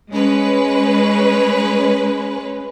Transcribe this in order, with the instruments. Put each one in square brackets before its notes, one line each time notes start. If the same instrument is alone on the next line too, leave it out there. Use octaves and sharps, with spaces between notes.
[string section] G#3 C#4 B4